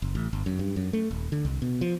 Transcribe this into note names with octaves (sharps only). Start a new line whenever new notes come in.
F#1
A1
G1
F#2
G2
F#2
A3
D#1
D3
C2
B2
F3